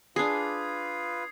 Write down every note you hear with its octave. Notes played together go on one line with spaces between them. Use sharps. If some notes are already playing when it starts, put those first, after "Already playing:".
D4 F4 G#4 B4 D#6 G#6 C7